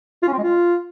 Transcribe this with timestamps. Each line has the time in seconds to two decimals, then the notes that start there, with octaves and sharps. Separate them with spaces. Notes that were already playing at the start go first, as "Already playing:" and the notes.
0.23 F4
0.28 C#4
0.33 C4
0.38 G#3
0.43 F4